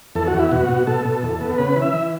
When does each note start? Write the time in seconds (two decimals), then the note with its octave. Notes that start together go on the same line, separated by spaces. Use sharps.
0.15 E2 A4
0.27 F#4
0.34 E2
0.39 E4
0.51 B2 F#4
0.69 B2
0.87 B2 A4
1.05 B2
1.23 E2
1.41 B3
1.58 C#3 B4
1.76 E3
1.82 E5
1.94 E3